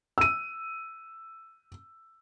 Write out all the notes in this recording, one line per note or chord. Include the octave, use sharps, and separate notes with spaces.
E6 D#7